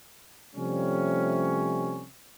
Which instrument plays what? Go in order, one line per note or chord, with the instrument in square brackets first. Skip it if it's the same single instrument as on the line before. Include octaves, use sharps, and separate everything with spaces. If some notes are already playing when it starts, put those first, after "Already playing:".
[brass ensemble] C3 F3 G3 A3 C#4